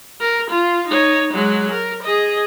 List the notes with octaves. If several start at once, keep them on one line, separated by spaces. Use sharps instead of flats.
A#4
F4
D#4 C#5
F#3 G#3
A#4
G#4 D#5